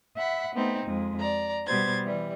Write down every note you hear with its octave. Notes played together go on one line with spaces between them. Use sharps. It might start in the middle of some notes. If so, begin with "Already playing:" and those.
E5 F#5 B5
A3 B3 C4 D#4
F2 G#3
D5 A#5
B2 G3 B3 C5 G#6 A6
E3 G3